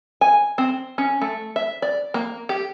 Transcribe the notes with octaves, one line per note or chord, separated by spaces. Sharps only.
G#5
C4
C#4
A3
E5
D5
A#3
G4